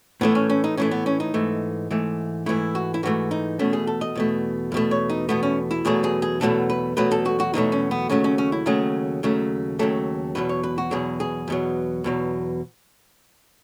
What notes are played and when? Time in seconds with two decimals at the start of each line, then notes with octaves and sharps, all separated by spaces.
0.21 A2 E3 A3 B3
0.35 C#4
0.50 C#4
0.64 D#4
0.77 A2 E3 A3 C#4
0.91 B3
1.06 C#4
1.20 D#4
1.34 G#2 E3 A3
1.91 G#2 E3 A3
2.46 G#2 E3 A3 E4
2.75 F#4
2.94 E4
3.03 G#2 E3 A3 F#4
3.31 D#4
3.59 E2 B2 A3 C#4
3.73 G#4
3.87 A4
4.01 D#5
4.15 E2 B2 A3
4.72 E2 B2 A3
4.91 C#5
5.10 D#4
5.29 E2 B2 A3 B3
5.43 C#4
5.71 E4
5.85 E2 B2 F#3 A3 G#4
6.04 G#4
6.22 G#4
6.41 E2 B2 F#3 A3 A4
6.70 B4
6.97 E2 B2 F#3 A3 B4
7.11 A4
7.26 F#4
7.40 F#4
7.54 E2 B2 F#3 A3 D#4
7.72 C#4
7.91 B3
8.09 D#2 C#3 F#3 A3 C#4
8.24 C#4
8.38 C#4
8.52 E4
8.66 D#2 C#3 F#3 A3 G#4
9.23 D#2 C#3 F#3 A3
9.79 D#2 C#3 F#3 A3 A4
10.35 E2 B2 F#3 B4
10.49 C#5
10.63 B4
10.78 F#4
10.91 E2 B2 F#3 G#4
11.20 G#4
11.48 E2 B2 F#3
12.04 E2 B2 F#3